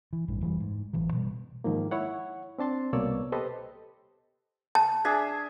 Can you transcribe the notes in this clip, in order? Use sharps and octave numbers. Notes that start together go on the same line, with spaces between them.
E3
A1 G2 E3
F1 E3 G3
G#2
A1 E3 F#3
B2 G3
G#2 D#3 F3 A#3
E4 C#5 F#5
C4 D4 A5 C6
C2 B2 A#3 C#5 D5 E6
G4 A4 B4 C5 D#5
A5
D4 G#4 E5